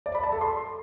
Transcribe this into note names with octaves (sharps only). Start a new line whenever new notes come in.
D5
B5
A5
A4
C6